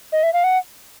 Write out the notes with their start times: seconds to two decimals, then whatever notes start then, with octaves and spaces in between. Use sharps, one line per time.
0.12 D#5
0.23 E5
0.33 F5
0.44 F#5